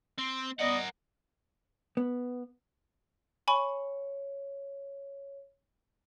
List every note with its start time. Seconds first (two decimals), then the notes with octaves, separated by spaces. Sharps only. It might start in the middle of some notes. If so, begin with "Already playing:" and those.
0.19 C4
0.59 B3 A#4 D5 D#5 F#5
1.97 B3
3.48 C#5 G#5 B5 C#6